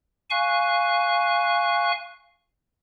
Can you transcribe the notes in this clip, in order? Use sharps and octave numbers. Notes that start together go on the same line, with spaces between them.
F5 G#5 C#6 F#6